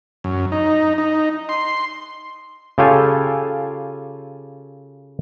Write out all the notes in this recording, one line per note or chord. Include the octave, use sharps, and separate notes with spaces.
F#2
D#4
D#4
C6
C#3 F4 G4 A4 F5 G#5